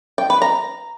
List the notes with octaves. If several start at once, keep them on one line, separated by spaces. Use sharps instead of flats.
G5
B4
A#5